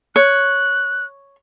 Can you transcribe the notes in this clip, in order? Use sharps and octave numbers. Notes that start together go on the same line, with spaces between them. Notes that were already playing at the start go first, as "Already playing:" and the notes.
C#5 F#6